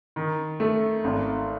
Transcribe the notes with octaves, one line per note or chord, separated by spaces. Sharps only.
D#3
A3
G#1